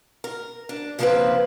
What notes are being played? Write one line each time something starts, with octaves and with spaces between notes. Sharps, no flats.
A#4
D4
C#3 F3 A#3 C4 F4 B4